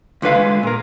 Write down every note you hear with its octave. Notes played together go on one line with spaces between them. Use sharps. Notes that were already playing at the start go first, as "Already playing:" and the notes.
C#2 D3 B4 F5
G#3
A#2 A#4